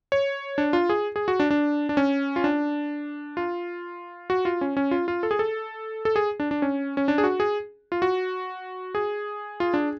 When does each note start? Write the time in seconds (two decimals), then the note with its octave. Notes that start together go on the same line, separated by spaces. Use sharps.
0.12 C#5
0.58 D4
0.73 F4
0.89 G#4
1.16 G#4
1.28 F#4
1.40 D4
1.51 D4
1.89 D4
1.97 C#4
2.36 F4
2.44 D4
3.37 F4
4.30 F#4
4.45 F4
4.61 C#4
4.77 C#4
4.91 F4
5.08 F4
5.23 A4
5.31 G#4
5.39 A4
6.05 A4
6.16 G#4
6.40 D4
6.51 D4
6.62 C#4
6.97 C#4
7.08 D4
7.18 G#4
7.24 F#4
7.40 G#4
7.92 F4
8.02 F#4
8.95 G#4
9.60 F4
9.74 D4